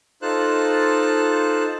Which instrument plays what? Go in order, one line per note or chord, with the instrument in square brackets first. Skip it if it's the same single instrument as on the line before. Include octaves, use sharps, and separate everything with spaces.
[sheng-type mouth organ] D#4 F4 A4 C5 A5 F#6